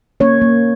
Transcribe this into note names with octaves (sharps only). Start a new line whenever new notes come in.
A#3 C#4 C#5
A#3